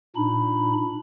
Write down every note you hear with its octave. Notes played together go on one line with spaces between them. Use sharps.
A#2 D4 D#4 B5